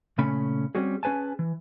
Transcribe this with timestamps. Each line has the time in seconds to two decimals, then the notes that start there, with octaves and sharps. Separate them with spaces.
0.18 A#2 C#3 A3 C#4 B5
0.75 G3 C4 C#4 F#4 G#4
1.03 C#4 G#4 B4 G#5 A5
1.39 E3